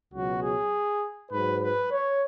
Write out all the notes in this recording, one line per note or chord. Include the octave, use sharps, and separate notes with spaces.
C#2 B2 F#3 F#4
G#4
G#2 F#3 B4
B4
C#5